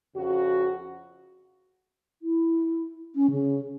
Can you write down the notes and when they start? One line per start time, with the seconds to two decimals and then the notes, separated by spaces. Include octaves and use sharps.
0.16 F2 C#3 F#4
2.22 E4
3.15 C#4
3.31 C#3